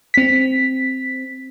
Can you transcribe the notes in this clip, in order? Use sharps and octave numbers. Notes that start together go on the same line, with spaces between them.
C4 B6